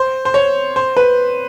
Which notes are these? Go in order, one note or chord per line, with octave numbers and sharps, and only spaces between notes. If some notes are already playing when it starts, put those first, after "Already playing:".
Already playing: C5
C5
C#5
C5
B4